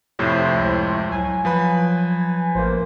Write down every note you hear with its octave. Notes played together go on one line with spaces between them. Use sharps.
F2 A2 C3 E4 C5 C#5
C#2
F#3 G#5
F3 B4 B5
A1 A#3 C5